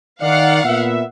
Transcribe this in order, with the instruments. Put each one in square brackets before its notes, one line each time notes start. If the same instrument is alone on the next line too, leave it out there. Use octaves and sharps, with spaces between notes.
[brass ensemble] D#3 D5 [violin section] F5 F#5
[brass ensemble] A#2 B3 E5